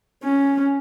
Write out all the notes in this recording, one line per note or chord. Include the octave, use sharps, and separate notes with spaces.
C#4